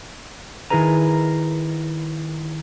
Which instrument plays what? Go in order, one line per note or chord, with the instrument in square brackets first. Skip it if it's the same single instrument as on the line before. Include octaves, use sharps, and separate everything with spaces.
[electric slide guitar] D#3 E4 G#4 A#4 B4 A#5